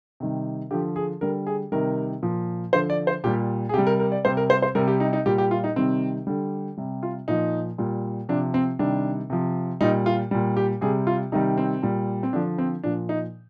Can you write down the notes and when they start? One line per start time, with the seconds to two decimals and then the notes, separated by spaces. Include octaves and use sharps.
0.20 C3 D#3 G3
0.71 D3 F3 G4
0.96 G#4
1.21 D3 G3 A#4
1.47 G#4
1.72 C3 D#3 G3 A#4
2.22 A#2 F3
2.73 D3 F3 C5
2.90 D5
3.07 C5
3.24 A#2 G4
3.27 G3
3.69 G#4
3.74 C3 G3 G4
3.87 A#4
4.00 A#4
4.12 D5
4.25 C3 G3 C5
4.37 A#4
4.50 C5
4.62 C5
4.75 C3 G3 A#4
4.88 G4
5.00 D#4
5.13 D#4
5.26 A#2 G3 G4
5.38 G4
5.51 F4
5.64 D#4
5.76 C3 D#3 G3 C4
6.27 D3 G3
6.77 C3 G3
7.03 F4
7.28 A#2 F3 D#4
7.78 A#2 G3
8.29 C3 F3 D4
8.54 C4
8.79 C3 D#3 G3 D4
9.30 C3 F3
9.81 A#2 G3 D#4
10.06 F4
10.31 A#2 G3
10.57 G4
10.81 C3 G3 G#4
11.07 F4
11.32 C3 D#3 G3 D#4
11.57 C4
11.83 A#2 G3
12.23 C4
12.33 D3 F3 D4
12.58 C4
12.84 A#2 F3 D4
13.09 D#4